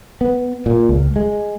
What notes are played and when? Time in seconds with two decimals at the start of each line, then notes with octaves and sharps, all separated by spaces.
0.21 B3
0.66 A#2
0.89 C#2
1.16 G#3